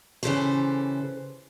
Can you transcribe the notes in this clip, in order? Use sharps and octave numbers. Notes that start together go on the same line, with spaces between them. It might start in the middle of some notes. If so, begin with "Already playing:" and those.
C#3 E3 F#3 G4 A4 C5